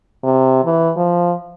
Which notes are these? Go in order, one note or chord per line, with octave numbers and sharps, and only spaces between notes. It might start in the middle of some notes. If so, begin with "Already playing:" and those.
C3
E3
F3